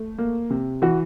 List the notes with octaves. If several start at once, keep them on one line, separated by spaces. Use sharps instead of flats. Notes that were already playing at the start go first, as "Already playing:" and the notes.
Already playing: A3
A#3
C3
E3 F#4